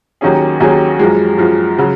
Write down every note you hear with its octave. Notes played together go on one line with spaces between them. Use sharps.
D#2 D#3 F#3 C#4 G#4
D#2 D#3 F#3 C#4 G#4
F#2 F3 G#3
F#2 F3 G#3
C#3 F#3